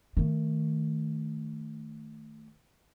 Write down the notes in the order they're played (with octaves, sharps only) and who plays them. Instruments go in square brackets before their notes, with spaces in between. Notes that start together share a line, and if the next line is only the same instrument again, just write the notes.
[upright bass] D#3 A3